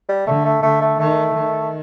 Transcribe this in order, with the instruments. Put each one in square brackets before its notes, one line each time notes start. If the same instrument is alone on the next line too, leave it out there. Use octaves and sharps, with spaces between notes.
[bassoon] G3
[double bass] D3 [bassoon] A3
[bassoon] A3
[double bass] D3 [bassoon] A3
[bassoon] A3
[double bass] D#3 [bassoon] A3
[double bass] D#3